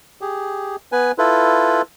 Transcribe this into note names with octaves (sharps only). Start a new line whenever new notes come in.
G4 G#4
B3 B4 G#5
E4 F4 A4 B4